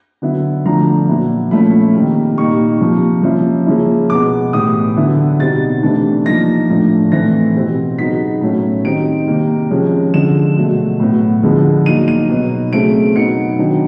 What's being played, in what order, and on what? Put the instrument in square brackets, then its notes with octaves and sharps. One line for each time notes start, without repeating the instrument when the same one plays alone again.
[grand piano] D3 F#3 B3 E4
D3 F3 A3 D4 A#5
A#2 F#3 B3 E4
A#2 F3 A3 C#4 E4 B5
C3 D#3 G3 A#3
A#2 G3 A#3 D#4 C#6
C3 F3 A#3
F3 A#3 C#4 E4
C#3 F3 A#3 C#4 E4
B2 G#3 B3 D6
A2 E3 G3 D#6
D3 F#3 B3 E4
B2 G3 C4 D#4 A6
C3 E3 A3 D4
F3 A#3 D#4 A#6
A2 F3 A3 D4
A2 E3 A3 C4 A#6
B2 G3 C4
C#3 F#3 B3 D#4 B6
A2 F#3 A3 C#4
D#3 G3 C4 D#4 D7
C3 D#3 G3 A#3
C3 F3 G#3 C#4
D3 F3 G#3 E7
B2 F#3 A3
A2 F#3 B3
D3 F3 G#3 B3
F#3 A#3 D#4 D#7
D#7
B2 F#3 B3 D#4
C#3 F#3 A3 C4 D7
B2 F#3 B3 D#4 C#7
D#3 F#3 B3 D4